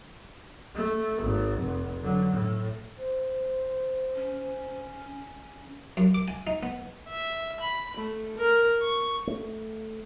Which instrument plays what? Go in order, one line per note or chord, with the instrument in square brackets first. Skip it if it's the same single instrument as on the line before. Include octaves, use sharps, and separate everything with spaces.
[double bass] A3
G#1
F1
D3 F#3
A2
[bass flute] C5
[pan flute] C#4
[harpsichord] F#2
D6
G#5
D#4
B3
[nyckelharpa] E5
B5
A3
A#4
C#6
[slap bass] A3